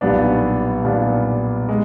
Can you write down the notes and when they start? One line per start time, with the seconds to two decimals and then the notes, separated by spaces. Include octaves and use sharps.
0.01 B1 A#2 G3 B3 D4
0.84 B1 A#2 G3 B3 D4
1.69 G#3